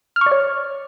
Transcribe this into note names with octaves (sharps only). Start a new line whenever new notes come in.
F6
C#6
D5
C#5